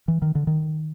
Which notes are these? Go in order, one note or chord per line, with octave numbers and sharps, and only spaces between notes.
E3
D#3
D3
D#3